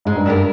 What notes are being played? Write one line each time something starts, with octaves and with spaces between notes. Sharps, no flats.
G#2 G#3
G2
G2 D4 G4 A#4